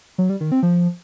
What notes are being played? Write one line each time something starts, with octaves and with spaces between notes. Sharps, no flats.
F#3
G3
D#3
C4
F3